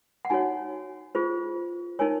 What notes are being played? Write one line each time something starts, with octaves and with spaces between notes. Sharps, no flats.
F#5
D#4 F#4 C#5 G#5
F4 G#4 C5
D#4 A#4 C#5 G#5